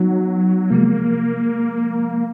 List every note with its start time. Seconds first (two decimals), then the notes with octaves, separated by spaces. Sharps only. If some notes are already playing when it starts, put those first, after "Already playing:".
Already playing: F#3 B3 D#4 F#4
0.70 C3 F3 G#3 A#3